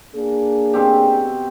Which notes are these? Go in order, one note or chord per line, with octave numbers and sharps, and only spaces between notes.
A#3 D4 G#4
B2 C4 G4